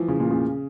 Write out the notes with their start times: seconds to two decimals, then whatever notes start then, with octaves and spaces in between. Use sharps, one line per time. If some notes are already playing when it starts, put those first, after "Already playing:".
Already playing: E3 F3
0.08 C#3
0.20 A#2
0.30 C#3